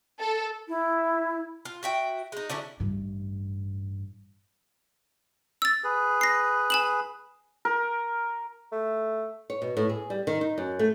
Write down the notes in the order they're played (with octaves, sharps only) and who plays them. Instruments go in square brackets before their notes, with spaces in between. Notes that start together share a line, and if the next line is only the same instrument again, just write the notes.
[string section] A4
[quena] E4
[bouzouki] F4
F#4 E5 G5
G#3 D#4
D3 F#3 C#4 E4
[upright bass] A1 G2
[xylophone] E6 A6
[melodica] G#4 B4
[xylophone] A#6 C7
G#5 E7 F#7
[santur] A#4
[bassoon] A3
[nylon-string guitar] C#5
B2
A2
G#4
G3
D#3
D#4
F#2
A3